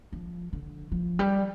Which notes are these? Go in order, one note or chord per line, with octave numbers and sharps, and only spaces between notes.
F3
D3
F3
G3